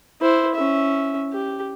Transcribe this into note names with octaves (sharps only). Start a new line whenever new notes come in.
E4 C5
C#4 E5
G4